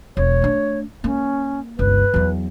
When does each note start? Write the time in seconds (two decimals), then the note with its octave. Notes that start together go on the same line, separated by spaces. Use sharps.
0.17 E1 C#5
0.42 A3 D4
1.04 A#3 C#4
1.79 G1 C#2 B4
2.14 E2 F#3